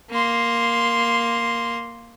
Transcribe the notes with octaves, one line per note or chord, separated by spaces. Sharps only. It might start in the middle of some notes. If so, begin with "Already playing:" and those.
A#3 C6